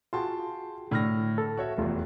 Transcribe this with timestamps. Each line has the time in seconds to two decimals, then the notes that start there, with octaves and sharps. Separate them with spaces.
0.13 F4 F#4 G#4 G5 A5 C6
0.91 A2 D3 F6 A#6
1.38 A4
1.57 F#4 C#5 E5
1.78 F1 E2 G3 A3 F4